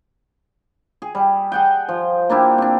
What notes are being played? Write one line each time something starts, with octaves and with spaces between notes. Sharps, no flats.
G#4
G3
G#4 F#5 G5
F3
A#3 D4 E4 G4
C4 D4